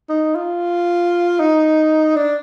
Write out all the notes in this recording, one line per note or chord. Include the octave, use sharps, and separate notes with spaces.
D#4
F4
D#4
D4